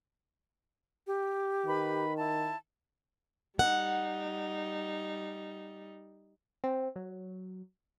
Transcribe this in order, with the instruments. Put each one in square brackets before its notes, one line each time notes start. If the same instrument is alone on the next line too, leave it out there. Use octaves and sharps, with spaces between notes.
[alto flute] G4
[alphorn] D#3 [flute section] B4 B5
[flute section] E4 A5
[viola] G3 D#4 [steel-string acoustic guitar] F#5
[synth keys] C4
F#3